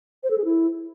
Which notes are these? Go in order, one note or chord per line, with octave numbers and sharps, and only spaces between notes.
C5
A4
G#4
E4